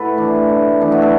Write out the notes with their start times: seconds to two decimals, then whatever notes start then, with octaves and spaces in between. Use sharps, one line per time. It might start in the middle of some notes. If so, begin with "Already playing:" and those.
Already playing: A2 F#4 A4 B4
0.17 E3 D4
0.49 A2
0.81 E3 B3 D4
0.92 F#4
1.02 A4